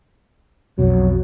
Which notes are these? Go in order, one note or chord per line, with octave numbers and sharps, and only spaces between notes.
B1 F2 B2 F#3